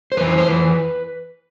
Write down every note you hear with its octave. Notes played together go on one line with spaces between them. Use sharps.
C5
F2 E3 B4
C5
C5
F2 E3 B4